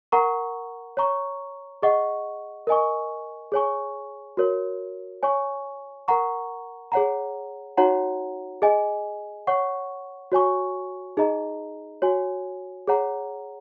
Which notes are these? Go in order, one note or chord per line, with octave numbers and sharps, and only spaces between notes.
A#4 F#5 A#5 C#6
C#5 A#5 C#6
G#4 D#5 F#5 C#6
A#4 D#5 G#5 C#6
G#4 C#5 G#5 C#6
F#4 A#4 C#5
C#5 G#5 C#6
A#4 F#5 A#5 C#6
G#4 C#5 F#5 A#5
D#4 F#4 C#5 F#5 A#5
G#4 D#5 G#5
C#5 F#5 C#6
F#4 C#5 G#5 C#6
D#4 G#4 D#5 A#5
F#4 C#5 G#5
G#4 C#5 F#5 A#5